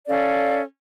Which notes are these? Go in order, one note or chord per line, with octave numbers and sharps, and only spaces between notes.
C#4 A4 D5 F5